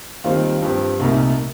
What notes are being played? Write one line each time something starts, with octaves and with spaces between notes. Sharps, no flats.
D#2 D#3 G3 C4 F4
G2 F3 C4 G4
C2 A#2 A3 D#4 A#4